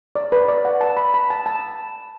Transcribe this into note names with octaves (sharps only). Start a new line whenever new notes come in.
D5
B4
D5
F#5
A5
B5
B5
A5
A5